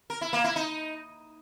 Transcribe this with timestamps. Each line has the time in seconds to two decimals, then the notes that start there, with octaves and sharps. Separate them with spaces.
0.10 A#4
0.21 E4
0.33 A#3
0.44 E4
0.56 D#4